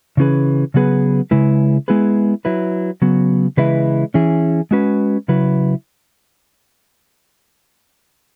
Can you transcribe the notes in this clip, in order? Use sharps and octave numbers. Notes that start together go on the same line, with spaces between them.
C#3 E3 C#4 G#4 B4
C#3 F#3 B3 G#4 B4
C#3 G#3 E4 B4
G#3 B3 E4 G#4 B4
F#3 E4 B4
C#3 F#3 B3
C#3 E3 G#3 E4 B4
E3 C#4 E4 G#4
G#3 C#4 F#4 B4
C#3 F#3 E4 B4